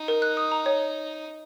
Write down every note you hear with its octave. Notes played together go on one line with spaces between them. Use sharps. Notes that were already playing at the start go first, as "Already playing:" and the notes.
Already playing: D#4
A#4
F#6
D#6
A#5
C#5